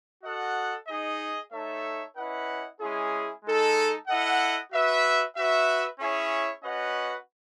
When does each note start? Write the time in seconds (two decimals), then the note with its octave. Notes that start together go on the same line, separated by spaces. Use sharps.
0.24 F#4 A4 D#5 F#5
0.88 D#4 G#4 D#5
1.52 A3 D#4 A4 C#5 E5
2.16 C#4 E4 B4 D#5 F#5
2.80 G#3 C#4 E4 G#4
3.44 G#3 D#4 A4
4.08 E4 A4 D#5 F#5
4.72 F#4 B4 E5
5.36 F#4 B4 E5
6.00 C#4 E4 G#4 C#5 E5
6.64 C#4 F#4 B4 D#5 F#5